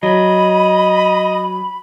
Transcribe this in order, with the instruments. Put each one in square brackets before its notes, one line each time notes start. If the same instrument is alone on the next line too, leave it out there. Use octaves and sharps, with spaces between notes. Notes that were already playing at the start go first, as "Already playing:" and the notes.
[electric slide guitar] F#3 [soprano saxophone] D#5 [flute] B5